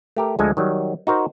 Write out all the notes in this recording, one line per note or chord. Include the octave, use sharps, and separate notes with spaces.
A3 G4 A#4
D2 F3 G#3 A4 G#5
D#3 F#3 G3
D#4 F#4 A#4 C5